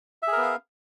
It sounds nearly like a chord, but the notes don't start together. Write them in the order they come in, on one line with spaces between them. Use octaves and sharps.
E5 G#4 A#4 B3 F5